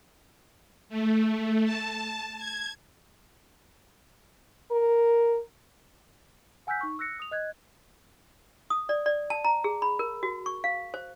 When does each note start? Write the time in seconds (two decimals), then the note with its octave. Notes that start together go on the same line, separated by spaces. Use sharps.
0.89 A3
1.65 A5
2.38 G#6
4.71 A#4
6.67 F#5 G#5 E6 F#6 G6 B6
6.81 D#4 C#6
6.99 E6 F#6 A#6 C#7
7.19 D#6 F7
7.31 D#5 F#6 G#6
8.70 D#6
8.89 D5
9.06 D5
9.30 A5
9.45 A#5
9.64 G#4
9.82 B5
9.99 A#4
10.23 F#4
10.46 C#6
10.64 F5
10.94 C5